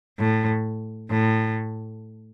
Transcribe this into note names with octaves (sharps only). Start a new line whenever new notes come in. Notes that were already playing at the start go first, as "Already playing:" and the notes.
A2
A2